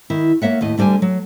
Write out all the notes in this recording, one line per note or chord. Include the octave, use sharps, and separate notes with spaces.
D#3 E4
A#3 C#5 E5 F#5
D#2 A2 D#5
D2 D3 G3 F#5 G#5
F#3